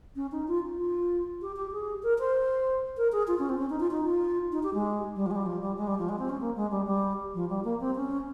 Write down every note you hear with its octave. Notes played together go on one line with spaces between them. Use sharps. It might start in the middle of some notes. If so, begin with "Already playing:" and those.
C#4
D#4
F4
F4
G4
G4
G#4
A#4
C5
A#4
G#4
F4
C#4
C4
C#4
D#4
F4
D#4
F4
D#4
G4
G#3
G3
F3
G#3
G3
F3
G3
G#3
G3
F3
G#3
C4
C#4
A#3
G#3
G3
G3
F3
G3
A#3
C4
C#4